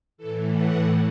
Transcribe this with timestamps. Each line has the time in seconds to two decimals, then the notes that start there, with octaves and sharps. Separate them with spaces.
0.17 A2 E3 A4
0.52 F#5